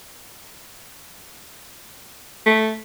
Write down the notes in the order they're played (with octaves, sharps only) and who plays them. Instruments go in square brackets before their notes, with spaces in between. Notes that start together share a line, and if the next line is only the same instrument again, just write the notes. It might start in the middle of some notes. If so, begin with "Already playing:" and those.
[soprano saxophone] A3